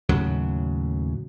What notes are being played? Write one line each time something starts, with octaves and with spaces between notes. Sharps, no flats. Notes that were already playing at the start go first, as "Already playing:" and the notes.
D#2 A2 C#3 F#3